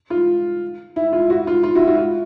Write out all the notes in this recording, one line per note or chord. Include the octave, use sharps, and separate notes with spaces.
F4
E4
F4
E4 F#4
F4
F4
E4 F#4
E4 F#4
F4